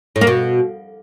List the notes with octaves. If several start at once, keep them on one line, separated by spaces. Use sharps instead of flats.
A2
A#3
B2